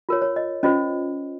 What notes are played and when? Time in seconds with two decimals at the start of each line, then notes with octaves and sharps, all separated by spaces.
0.09 F4 A#4 C#5
0.22 C#5
0.36 D#5
0.63 C#4 F4 C5 D#5